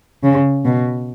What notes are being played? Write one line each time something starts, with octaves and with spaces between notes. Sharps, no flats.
C#3
B2